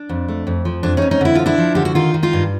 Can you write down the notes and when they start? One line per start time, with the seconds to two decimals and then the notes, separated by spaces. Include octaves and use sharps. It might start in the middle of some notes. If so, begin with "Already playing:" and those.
Already playing: D4
0.09 F2
0.28 A3
0.47 F2
0.65 F3
0.83 F2 D4
0.97 C#4 D#4
1.02 F2
1.11 C#4 D#4
1.21 D3 E4
1.35 F3 F4
1.46 D4 E4
1.58 F3
1.75 D3 G4
1.85 F#4
1.95 D#3 D#4 F4
2.14 D#3
2.23 D#4 F4
2.33 G2